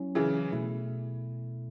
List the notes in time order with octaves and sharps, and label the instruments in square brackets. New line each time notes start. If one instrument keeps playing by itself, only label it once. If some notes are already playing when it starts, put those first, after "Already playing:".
Already playing: [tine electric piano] F#3 C#4 E4
[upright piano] C#3 E3
[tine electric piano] B2 A3 E4